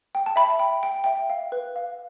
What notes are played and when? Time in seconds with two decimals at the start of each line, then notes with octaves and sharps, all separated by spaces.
0.15 G5
0.26 A5
0.36 E5 B5
0.59 G5
0.83 G5
1.04 E5 G5
1.30 F5
1.52 B4
1.76 F5